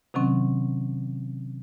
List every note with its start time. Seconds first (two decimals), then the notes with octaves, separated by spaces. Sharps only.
0.14 C3 D#3 F#3 C4 C#4